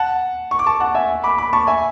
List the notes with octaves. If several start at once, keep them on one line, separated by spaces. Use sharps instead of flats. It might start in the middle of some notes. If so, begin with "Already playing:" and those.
Already playing: F#5 A5
C#6
D6
A5 C#6
F#5 A5
E5 G#5
B5 D6
B5 D6
A5 C#6
E5 G#5